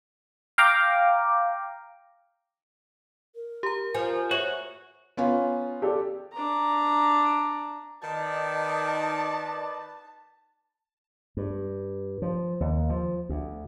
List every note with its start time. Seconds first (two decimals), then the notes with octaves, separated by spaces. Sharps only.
0.58 F5 G5 A#5 D6
3.35 A#4
3.63 G4 A#5
3.94 F3 G#5
4.31 F#4 C#5 E5
5.17 B3 C#4 F4
5.82 G4 A4 D5
6.33 D4 A#5
8.02 D#3 D#4 B4 D5 A5
11.37 G2
12.22 F3
12.60 D#2
12.90 F3
13.29 D2